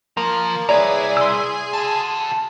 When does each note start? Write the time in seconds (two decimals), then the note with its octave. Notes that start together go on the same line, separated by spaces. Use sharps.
0.17 F3 A#3 A#5
0.69 C2 E4 G#4 B4 C#5 D5 G#5 A#5
1.17 C6 E6
1.73 F#4 A4 A5